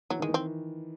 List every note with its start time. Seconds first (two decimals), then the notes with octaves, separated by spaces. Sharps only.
0.10 E3 F#3
0.20 D#3 G#3
0.29 E3
0.34 C4